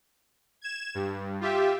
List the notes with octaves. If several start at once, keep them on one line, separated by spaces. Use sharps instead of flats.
G#6 E7
G2
F4 G4 E5